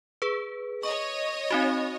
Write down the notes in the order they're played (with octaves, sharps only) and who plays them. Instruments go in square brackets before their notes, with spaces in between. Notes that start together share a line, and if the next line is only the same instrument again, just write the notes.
[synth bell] G#4 B4
[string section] C#5 D#5 [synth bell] C#6
[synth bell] C4 D#4 F#4